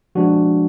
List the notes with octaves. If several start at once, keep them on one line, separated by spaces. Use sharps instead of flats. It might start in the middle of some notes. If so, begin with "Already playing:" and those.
F3 G#3 D4 F#4